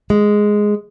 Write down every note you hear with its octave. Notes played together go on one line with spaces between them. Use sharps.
G#3